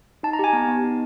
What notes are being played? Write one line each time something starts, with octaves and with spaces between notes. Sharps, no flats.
D#4 A5
A#5
G4 G#5
B3 A5
B3
D#4